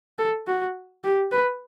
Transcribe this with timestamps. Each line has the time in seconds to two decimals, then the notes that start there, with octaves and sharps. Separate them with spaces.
0.19 A4
0.47 F#4
1.04 G4
1.32 B4